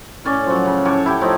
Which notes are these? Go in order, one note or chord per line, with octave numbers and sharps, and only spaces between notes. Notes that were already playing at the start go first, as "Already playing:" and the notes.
A2 C#4 D5
F3 F#3
C#3
A2 C#5 A5 D6
E4 G4 G5
F3 A3 D#4